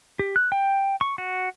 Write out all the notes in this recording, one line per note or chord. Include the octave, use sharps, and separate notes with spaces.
G4
F#6
G5
C#6
F#4